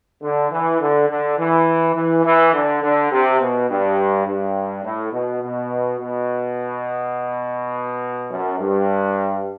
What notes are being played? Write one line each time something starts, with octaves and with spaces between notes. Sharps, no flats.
D3
E3
D3
D3
E3
E3
E3
D3
D3
C3
B2
G2
G2
A2
B2
B2
B2
F#2
G2